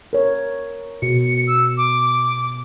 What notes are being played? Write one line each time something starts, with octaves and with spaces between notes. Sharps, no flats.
A#4 C#5
B2 C#7
E6
D6